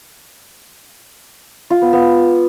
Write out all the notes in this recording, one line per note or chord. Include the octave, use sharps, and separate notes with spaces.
F4
B3
B3